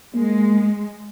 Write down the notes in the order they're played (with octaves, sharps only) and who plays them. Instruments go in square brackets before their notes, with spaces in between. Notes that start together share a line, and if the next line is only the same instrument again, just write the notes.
[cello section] G#3 [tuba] A#3